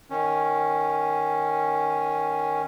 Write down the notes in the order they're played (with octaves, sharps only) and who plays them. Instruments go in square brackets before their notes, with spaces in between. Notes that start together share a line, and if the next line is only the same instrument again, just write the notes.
[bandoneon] D#3 C#4